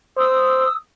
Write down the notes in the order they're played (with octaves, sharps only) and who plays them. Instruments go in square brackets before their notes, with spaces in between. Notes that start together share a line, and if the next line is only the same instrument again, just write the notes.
[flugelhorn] C5 [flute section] D#6 E6